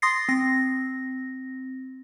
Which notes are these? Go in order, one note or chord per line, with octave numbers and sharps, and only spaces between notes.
C6 D#6 A6 A#6 C7
C4 A#6